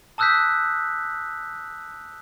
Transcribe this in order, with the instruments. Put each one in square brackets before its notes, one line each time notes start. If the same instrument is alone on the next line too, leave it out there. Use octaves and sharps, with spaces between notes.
[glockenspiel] A5 D#6 E6 F#6 G6 B6